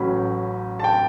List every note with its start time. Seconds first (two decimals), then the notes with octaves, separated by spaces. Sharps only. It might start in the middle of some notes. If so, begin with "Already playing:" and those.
Already playing: A1 A2 F#3 C#4 B5
0.80 A5
0.84 G5